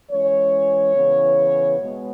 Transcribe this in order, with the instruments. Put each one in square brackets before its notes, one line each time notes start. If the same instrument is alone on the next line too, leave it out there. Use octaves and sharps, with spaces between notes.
[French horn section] E3 G#3 C#4 C#5
C#3 E3 B3
B2 G#3 B3